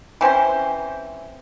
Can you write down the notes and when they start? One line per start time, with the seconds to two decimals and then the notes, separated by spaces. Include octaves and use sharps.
0.21 E3 C4 C#4 C5